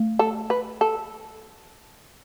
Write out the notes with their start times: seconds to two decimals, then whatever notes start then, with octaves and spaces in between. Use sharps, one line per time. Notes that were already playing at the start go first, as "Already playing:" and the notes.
Already playing: A3
0.19 A4
0.50 B4
0.81 A4